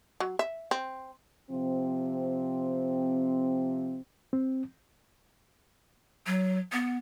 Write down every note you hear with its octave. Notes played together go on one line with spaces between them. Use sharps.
F#3
E5
C4
C3 F3 C4
C4
F#3
B3